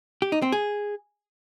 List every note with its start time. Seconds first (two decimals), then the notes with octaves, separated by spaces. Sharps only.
0.22 G4
0.32 D#4
0.42 C4
0.52 G#4